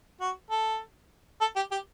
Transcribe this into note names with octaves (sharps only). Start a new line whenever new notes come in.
F#4
A4
A4
G4
G4